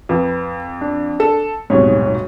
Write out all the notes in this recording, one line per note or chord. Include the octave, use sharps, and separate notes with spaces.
F2 B4
D4
A4
D#1 B1 G#2 C3 C#5